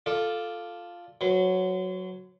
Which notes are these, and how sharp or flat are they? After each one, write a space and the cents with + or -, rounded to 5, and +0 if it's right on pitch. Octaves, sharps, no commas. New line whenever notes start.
F4 +0 A4 +0 D5 +0
F#3 +0 C5 -40